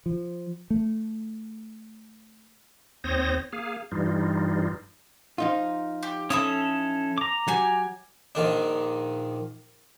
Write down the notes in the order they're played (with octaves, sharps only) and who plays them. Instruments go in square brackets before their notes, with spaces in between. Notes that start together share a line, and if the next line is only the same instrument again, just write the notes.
[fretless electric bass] F3
A3
[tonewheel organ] D#2 C4 C5 C#5 D#6 A#6
A#3 G#4 F5
G2 E3 G3 D#4 F4
[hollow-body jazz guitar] F3 D#4 F4
[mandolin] G4
[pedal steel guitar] C#4 A4 [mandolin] E4 E5 D#6
[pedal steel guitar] A#5 D6
[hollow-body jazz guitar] F#3 [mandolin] G4 G#5
[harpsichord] A#1 D#3 D4